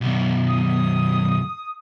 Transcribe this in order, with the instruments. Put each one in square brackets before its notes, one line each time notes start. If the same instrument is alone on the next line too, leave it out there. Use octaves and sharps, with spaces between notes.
[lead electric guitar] B1 F#2
[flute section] D#6